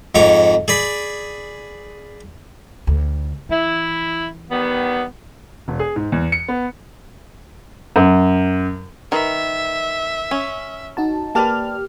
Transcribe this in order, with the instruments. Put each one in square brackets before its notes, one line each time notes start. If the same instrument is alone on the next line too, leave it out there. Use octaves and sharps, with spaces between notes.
[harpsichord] F2 G#2 C#5 D6
G#4 D5 B5
[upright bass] D2
[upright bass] E3 [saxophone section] E4
[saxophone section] D#3 G3 B3
[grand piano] E1
G#4
G#2
E2
C#7
B3
[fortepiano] F#2
[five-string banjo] D#3 [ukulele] B4 A#5 [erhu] E5
[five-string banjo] C#4
[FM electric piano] D#4 F#4 A5
[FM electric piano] A#3 G4 F6 [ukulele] B4 D5 A5